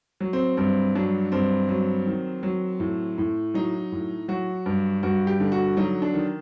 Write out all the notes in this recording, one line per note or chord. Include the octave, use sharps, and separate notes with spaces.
F#3
C4
G2 C4
F#3 D4
G2 C4
F#3
D#3
F#3
A2
A2
F#3 D#4
A2
F#3 F#4
G2
G2 F#4
G4
D3
F#4
F#3 D#4
D4
D#3